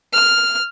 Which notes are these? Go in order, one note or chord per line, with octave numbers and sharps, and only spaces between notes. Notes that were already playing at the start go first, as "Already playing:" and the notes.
F6